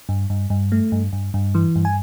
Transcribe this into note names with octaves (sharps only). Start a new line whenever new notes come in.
G2
G2
G2
A3
G2
G2
G2
E3
G2
G#5